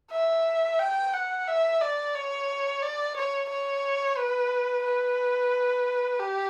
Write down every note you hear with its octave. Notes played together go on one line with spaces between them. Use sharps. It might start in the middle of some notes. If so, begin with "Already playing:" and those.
E5
G5
F#5
E5
D5
C#5
D5
C#5
C#5
B4
B4
G4